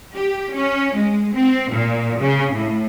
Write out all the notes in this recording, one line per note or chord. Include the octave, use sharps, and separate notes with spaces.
G4
C#4
G#3
C4
A#2
C#3
A2